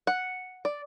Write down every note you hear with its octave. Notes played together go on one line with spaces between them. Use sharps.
F#5
D5